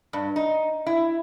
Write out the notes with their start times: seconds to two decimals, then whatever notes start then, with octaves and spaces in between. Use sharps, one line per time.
0.13 G2
0.36 D#4
0.87 E4